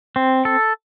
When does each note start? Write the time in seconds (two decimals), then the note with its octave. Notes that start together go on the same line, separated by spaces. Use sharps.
0.16 C4
0.45 A4